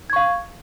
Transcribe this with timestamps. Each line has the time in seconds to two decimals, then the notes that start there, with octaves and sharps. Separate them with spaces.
0.10 G#6
0.13 C#6
0.16 F5